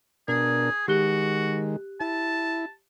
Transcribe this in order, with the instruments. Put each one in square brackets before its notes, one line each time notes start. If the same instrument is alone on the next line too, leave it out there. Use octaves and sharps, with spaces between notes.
[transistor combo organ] B2 D4 A#4 [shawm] G#4
[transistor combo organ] D#3 G#3 [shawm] F#4 [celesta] G4 F#6 G7
[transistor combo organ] E4 [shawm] A5